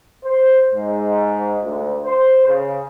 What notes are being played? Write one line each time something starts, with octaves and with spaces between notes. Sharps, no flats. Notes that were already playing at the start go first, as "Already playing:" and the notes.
C5
G#2
D2
C5
C#3